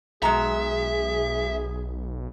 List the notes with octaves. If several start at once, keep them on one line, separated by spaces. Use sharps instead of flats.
B1 G#3 F#4 G#4 E5 A#5